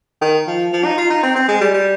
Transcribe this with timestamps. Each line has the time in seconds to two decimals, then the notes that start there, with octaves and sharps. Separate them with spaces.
0.21 D#3
0.47 F3
0.73 F3
0.85 D#4
0.98 F4
1.10 D#4
1.23 C4
1.36 C4
1.48 G#3
1.61 G3
1.74 G3